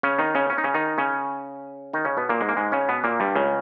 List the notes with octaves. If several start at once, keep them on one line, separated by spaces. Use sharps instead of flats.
C#3 C#4
D#3 D#4
C#3 C#4
C#4
D#4
C#3 C#4
D#3 D#4
C#3 C#4
D#3 D#4
C#3 C#4
B2 B3
A#2 A#3
G#2 G#3
A#3
G#2 G#3
C#3 C#4
B2 B3
A#2 A#3
G2 G3
C#2 C#3